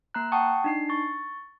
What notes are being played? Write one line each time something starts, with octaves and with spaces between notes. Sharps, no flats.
A#3 A#5 F#6
F#5 G5 A5 C#6 D#6
D4 D#4 C7
C#6 A6